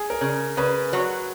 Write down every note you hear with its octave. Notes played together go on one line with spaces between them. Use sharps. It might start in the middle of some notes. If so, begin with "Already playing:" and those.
Already playing: G#4
A#4
C#3
C#3 B4
F#3